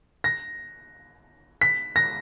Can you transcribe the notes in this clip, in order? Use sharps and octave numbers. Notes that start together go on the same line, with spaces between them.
A#6
B6
A#6